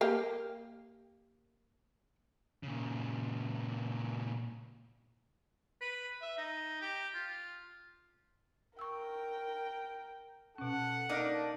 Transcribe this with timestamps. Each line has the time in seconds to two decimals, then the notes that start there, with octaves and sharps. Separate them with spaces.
0.01 A#3 G4 F5
2.63 A#2 C#3
5.81 B4
6.21 E5
6.38 D#4
6.81 G4
7.14 F4
8.79 A#4 G5 C#6 E6
10.58 B2 C#4 A4 F#5
11.09 A#3 D4 D#4